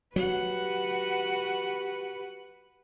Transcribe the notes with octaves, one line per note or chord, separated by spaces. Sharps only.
F#3 F#4 G4 B4 F#5